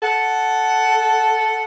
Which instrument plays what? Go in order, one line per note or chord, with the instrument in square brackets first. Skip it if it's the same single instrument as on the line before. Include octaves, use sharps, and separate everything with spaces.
[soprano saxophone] A4 [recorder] F#5